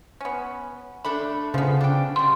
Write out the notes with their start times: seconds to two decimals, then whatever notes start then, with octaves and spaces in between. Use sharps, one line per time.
0.21 B3 C#4
1.04 A3 D4 A4 B5
1.54 C#3 F3 B3
1.81 D4 G5
2.16 G2 G3 C6